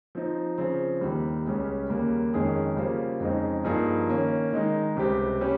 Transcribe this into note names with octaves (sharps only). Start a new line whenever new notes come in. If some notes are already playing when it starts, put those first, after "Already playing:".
F3 C4 D#4
C#3 F3 C4
D#2 D#3 G3
C#2 C#3 G3 C#4
D#2 C#3 G3 A#3
F2 D#3 G#3 C#4 G#4
C#3 G3 A#3 F4 C5
F2 C#3 G#3 C4 D#4
G2 F3 A#3 D#4 G#4
D#3 A#3 C#4
D#3 G#3 D#4
C#2 C3 G3 C4 G4
G3 C#4 G4